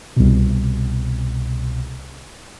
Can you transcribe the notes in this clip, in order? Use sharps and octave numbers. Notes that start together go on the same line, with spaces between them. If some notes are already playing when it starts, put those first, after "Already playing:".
C2 B2